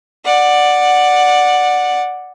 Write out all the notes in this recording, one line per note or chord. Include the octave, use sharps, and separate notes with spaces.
D5 F#5